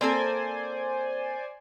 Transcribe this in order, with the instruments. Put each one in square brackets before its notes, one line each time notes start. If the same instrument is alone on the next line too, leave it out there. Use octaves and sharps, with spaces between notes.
[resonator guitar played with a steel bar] A#3 C4 A4 [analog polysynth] C5 D5 G#5